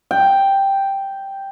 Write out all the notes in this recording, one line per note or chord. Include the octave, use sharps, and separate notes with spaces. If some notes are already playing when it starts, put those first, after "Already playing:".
G5